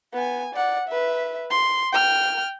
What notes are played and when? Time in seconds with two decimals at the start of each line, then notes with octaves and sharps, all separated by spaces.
0.13 B3 G#5
0.55 D5 F#5
0.88 B4 E5
1.51 C6
1.92 G5 F6